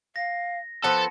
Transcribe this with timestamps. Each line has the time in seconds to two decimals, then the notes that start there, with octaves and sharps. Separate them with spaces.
0.16 F5 A#6
0.84 F3 B3 A4 B4 C5 A5 C#7